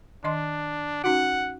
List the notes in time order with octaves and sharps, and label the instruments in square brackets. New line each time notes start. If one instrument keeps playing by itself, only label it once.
[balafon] D#3 D#5 C6 [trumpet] D4
[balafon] C#4 D#4 F#4 [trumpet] F#5